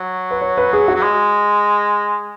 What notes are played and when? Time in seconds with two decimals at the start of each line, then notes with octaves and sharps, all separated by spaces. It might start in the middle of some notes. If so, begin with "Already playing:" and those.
Already playing: F#3
0.31 B4
0.42 C#5
0.57 B4
0.73 G#4
0.88 F#4
0.95 F#3
1.02 G#3